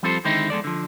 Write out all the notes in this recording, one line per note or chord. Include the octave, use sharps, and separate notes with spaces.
F3 G3 C4 F4 A4 C5
D3 D#3 G#3 C4 D#4 E4
E2 G#3 A4 D5
D3 F3